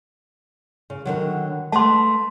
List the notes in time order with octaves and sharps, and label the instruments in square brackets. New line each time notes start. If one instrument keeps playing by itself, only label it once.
[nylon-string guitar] C#3
D3 D#3 F#3
[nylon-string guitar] A3 B4 [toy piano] A5 C6